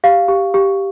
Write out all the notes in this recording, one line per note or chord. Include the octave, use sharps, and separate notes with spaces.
G4 F5
G4
G4